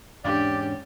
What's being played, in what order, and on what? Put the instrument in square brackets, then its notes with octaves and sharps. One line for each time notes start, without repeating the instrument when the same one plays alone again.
[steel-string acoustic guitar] E2 G#2 C#4 [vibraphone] D4 [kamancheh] G4 [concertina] D5